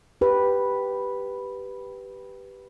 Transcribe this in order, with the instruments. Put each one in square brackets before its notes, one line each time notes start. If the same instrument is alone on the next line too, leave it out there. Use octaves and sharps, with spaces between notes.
[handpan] G4 B4